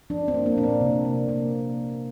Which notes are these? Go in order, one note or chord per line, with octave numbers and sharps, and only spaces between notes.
F3 D4
C4
A#3
A#3
A#2 D4
C4
C3
A#3
A#3